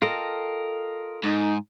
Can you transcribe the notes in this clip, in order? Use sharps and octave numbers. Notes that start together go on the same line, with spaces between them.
F4 A4 A#4 D#5 G5
G#2 D#4